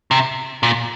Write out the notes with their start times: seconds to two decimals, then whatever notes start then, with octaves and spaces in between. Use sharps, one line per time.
0.11 C3
0.63 A#2